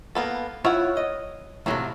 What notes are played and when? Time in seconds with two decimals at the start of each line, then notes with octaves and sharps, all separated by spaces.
0.15 A#3 B3 A4
0.65 E4 F4 C#5 E5 F#5
0.97 D#5
1.66 E2 A2 C3 F#3 A3 A#3